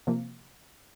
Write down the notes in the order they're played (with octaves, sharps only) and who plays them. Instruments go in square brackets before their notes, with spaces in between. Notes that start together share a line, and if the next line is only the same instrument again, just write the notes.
[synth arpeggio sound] C3 F3 A#3